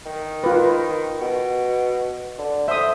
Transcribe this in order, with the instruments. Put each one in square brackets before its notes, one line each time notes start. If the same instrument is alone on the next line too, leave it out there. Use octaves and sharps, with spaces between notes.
[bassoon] D#3
[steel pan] F4 B4
[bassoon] B2
D3
[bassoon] C5 [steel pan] E5 D#6